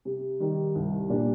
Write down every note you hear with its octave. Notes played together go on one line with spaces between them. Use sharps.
C3
D#3 G3
C2
A#2 G3 D4